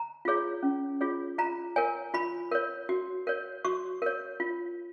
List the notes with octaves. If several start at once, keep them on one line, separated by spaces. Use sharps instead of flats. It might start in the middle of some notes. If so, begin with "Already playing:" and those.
Already playing: A#5
F4 G#4 C#5
C#4
F4 G#4 C#5
F4 A#5
A#4 C#5 G#5
F4 B5
A#4 C#5
F#4
A#4 C#5
F#4 C#6
A#4 C#5
F4